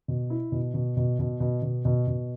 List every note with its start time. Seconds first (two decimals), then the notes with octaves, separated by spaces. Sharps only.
0.08 B2
0.30 E4
0.52 B2
0.74 B2
0.97 B2
1.19 B2
1.40 B2
1.62 B2
1.85 B2
2.07 B2